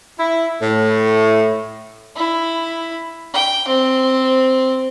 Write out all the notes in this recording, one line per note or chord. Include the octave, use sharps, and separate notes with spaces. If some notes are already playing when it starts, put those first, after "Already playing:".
E4
A2
E4
G5
C4